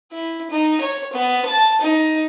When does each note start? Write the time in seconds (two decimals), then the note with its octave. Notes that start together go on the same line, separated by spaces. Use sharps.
0.12 E4
0.50 D#4
0.81 C#5
1.13 B3
1.45 A5
1.81 D#4